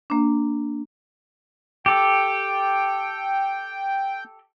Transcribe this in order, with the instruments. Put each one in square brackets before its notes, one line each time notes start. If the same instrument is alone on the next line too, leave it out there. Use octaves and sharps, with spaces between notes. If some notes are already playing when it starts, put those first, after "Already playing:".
[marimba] A#3 D4
[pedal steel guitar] G4 A4 [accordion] G5